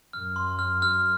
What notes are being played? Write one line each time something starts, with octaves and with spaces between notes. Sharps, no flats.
F#2 F6
C6
F6
F6